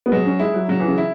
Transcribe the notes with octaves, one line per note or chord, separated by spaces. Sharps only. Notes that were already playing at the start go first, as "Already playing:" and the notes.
B3
F#3 G#3
C#4
G#3 E4
F#3
C#3 F#3
E3
C#3
E4